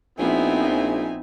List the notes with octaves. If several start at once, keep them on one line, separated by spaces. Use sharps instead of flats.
A#1 F3 B3 C4 D#4 E4 E5 G#5